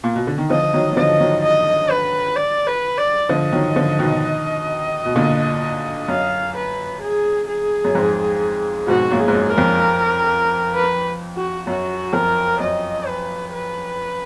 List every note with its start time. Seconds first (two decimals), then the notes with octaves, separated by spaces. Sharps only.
0.04 A#2
0.16 B2
0.27 D3
0.38 D#3
0.50 D3 F3 D#5
0.73 D#3 F#3
0.92 F#3
0.97 D3 F3 D#5
1.20 D#3 F#3
1.43 D#5
1.90 B4
2.36 D5
2.67 B4
2.98 D5
3.29 D3 F3 D#5
3.52 D#3 F#3
3.76 D3 F3
3.99 B2 D#3
5.06 B2
5.15 A#2 D3
6.08 F#2 F5
6.55 B4
7.01 G#4
7.48 G#4
7.85 F#2
7.95 F2 G#2
8.88 G#2 B2 F#4
9.11 F#2 A#2
9.19 G#4
9.28 G#2
9.34 F#2
9.50 A#4
9.58 F2
10.74 B4
11.36 F#4
11.67 F#2 F#4
12.13 F2 A#4
12.60 F#2 D#5
13.07 B4
13.53 B4